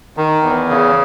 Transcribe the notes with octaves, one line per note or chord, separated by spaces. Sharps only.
D#3
E2
C#3